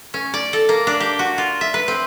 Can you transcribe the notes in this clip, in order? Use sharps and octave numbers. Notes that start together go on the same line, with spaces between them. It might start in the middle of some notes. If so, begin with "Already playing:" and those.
C#4
D5
A4
A#3
D4
G4
F#4
F4
E5
B4
C4